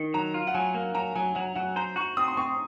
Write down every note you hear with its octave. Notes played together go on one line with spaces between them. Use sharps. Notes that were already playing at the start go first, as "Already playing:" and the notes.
Already playing: D#3
F#3 A#5
F4
F#5
F#3 G#5
A#3
F#3 A#5
F#3 G#5
F#3 F#5
F#3 F#5
C5 A#5
F#4 C#6
C4 D#6
C6
C4 C#6